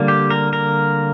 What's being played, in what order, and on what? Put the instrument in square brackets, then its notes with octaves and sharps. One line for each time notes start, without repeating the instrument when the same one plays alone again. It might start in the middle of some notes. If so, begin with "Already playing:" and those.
Already playing: [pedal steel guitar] D3 G3 A#3
G4
A#4
A#4